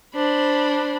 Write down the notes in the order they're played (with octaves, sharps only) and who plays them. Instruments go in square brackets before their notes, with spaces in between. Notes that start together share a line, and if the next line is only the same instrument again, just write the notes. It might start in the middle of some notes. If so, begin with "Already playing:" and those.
[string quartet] D4 C5 B5